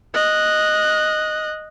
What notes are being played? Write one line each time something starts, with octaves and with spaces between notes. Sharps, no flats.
D#5 F#6